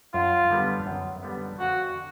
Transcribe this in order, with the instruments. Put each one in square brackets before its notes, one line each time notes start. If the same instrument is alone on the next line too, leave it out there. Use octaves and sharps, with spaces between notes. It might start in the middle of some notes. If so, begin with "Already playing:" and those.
[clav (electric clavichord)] F#2 [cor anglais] F4
[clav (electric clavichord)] D3 G3 B3
F#2
D3 G3 B3
[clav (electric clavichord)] F2 [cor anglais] F#4
[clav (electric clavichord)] D3